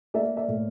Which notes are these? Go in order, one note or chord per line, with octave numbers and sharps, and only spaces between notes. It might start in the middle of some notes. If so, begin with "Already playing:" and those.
A#3 D5 E5
D5 E5
A2